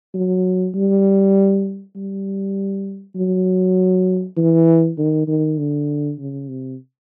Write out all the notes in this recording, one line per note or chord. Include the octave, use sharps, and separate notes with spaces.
F#3
G3
G3
F#3
E3
D#3
D#3
D3
C#3
C3